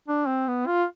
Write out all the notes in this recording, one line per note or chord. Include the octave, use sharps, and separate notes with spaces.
D4
C4
B3
F4